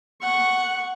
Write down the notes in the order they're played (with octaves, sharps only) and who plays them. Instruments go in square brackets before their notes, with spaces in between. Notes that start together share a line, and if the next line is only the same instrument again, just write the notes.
[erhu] F#5 [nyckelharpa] C#6